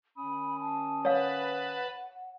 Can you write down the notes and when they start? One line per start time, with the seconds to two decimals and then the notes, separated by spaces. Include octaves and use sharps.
0.17 D#3 C#4 B5 D#6
0.61 A5
1.05 B4 C#5 F5 F#5 A5 B5